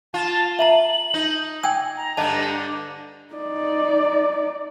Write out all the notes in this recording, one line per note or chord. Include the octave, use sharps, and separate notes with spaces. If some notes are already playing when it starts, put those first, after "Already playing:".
F4 A5
E5 A5 A#5 F#7
D#4
G5 G#5 E6 G#6
A#5
G2 D3 D4 D#5 A5
D#4 D5